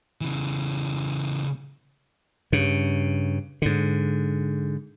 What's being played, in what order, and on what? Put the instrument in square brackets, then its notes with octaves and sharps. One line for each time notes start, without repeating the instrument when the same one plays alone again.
[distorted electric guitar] C#3 E3
[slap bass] G2 C#3
G#2 D3